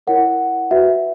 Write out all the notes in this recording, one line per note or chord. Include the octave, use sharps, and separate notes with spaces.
E4 A#4 C#5 F#5
F#4 B4 E5